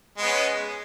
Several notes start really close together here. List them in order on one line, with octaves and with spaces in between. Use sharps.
G#3 B3 C#4